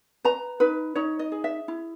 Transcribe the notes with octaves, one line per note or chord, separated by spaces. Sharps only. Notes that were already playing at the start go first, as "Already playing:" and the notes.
B4 A#5
D#4 B4
D#4 C#5
D#5
G#4
E5
E4